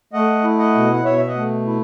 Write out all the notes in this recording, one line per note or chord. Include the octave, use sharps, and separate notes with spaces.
A3 D#5 F#5
E4
D#5 F#5
B2
F#5
B2 C#5 E5
E5
D#5 F#5
A3
E4